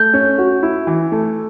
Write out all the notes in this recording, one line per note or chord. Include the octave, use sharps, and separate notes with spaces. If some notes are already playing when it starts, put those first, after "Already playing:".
Already playing: A3 G6
C#4
F#4
E4
E3
A3